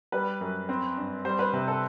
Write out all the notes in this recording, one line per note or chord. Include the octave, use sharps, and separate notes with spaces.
G3 B4
F#2
C4
G2
G3 C5
B4
C3
A4